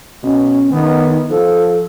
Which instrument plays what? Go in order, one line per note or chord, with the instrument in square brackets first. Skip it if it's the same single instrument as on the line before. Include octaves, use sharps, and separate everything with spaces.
[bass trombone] B2 [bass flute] C#4
[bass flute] D#3 [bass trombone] B3
[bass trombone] F3 [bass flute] A4